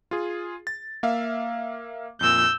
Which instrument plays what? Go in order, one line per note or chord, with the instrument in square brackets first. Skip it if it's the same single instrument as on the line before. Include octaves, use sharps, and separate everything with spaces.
[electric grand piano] F4 G#4
A6
A#3 E5 F5
[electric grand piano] F2 A#2 [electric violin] E6 G6